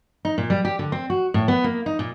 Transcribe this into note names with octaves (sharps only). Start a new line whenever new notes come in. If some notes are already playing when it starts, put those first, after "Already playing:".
D#4
A#2
G3
G4
D3
C4
F#4
A2
B3
A#3
D#4
A#2